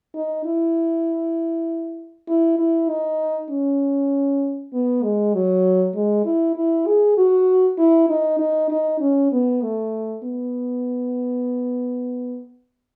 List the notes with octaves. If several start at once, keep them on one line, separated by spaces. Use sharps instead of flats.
D#4
E4
E4
E4
D#4
C#4
B3
G#3
F#3
G#3
E4
E4
G#4
F#4
E4
D#4
D#4
D#4
C#4
B3
A3
B3